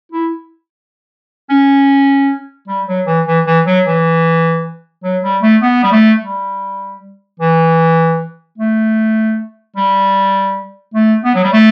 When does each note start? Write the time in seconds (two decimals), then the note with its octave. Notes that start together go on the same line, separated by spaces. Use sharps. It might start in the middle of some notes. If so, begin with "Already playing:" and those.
0.12 E4
1.50 C#4
2.68 G3
2.87 F#3
3.07 E3
3.26 E3
3.46 E3
3.66 F#3
3.86 E3
5.04 F#3
5.23 G3
5.43 A3
5.62 B3
5.83 G3
5.92 A3
6.21 G3
7.40 E3
8.58 A3
9.76 G3
10.94 A3
11.24 B3
11.35 F#3
11.44 G3
11.53 A3